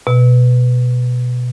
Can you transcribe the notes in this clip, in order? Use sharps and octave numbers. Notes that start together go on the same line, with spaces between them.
B2